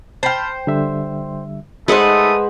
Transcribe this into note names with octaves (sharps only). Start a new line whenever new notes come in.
C5 G5 A5 B5 F6
D3 G3 E5
G#3 A3 D#4 B4 C5 F#5 B5 D#6